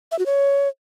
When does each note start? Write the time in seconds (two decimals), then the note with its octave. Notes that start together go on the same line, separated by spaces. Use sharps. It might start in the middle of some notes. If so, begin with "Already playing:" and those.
0.12 E5
0.19 F#4
0.26 C#5